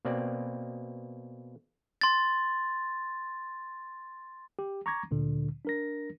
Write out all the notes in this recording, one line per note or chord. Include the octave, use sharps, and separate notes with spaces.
B2 A#3 C4 D5
C6 A6
G4
A#5 C#6 D6 G#6 A#6
D2 A#2 D3
D4 A#4 A#6